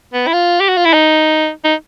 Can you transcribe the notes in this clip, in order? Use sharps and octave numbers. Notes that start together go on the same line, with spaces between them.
B3
E4
F4
G4
F#4
F4
E4
D#4
D#4